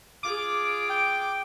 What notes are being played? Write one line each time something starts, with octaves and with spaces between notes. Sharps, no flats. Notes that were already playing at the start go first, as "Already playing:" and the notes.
F4 G#4 D6
G5